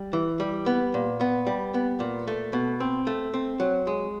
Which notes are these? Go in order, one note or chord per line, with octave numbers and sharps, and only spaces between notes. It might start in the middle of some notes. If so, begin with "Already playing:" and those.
Already playing: G3
E3
G3
B3
A#2
B3
G3
B3
A#2
A3
B2
C4
A3
C4
F#3
G#3